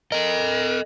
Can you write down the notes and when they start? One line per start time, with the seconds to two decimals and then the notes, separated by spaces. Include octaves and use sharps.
0.12 A4 A#4 D#5